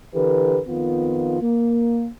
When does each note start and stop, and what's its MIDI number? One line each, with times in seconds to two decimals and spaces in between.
0.14 0.59 50
0.14 0.59 52
0.14 0.59 67
0.14 0.59 70
0.14 0.59 71
0.68 1.41 41
0.68 1.41 51
0.68 1.41 59
0.68 1.41 65
1.42 2.08 58